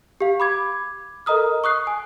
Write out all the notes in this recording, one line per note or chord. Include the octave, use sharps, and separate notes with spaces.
G4 F5
B5 D6 G#6
A4 A#4 D#5 A#5 D#6 F6
C#6 D#6 F#6 C7
G#5